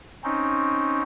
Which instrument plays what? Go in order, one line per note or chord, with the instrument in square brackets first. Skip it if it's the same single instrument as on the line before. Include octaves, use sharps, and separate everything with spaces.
[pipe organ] C4 C#4 D#4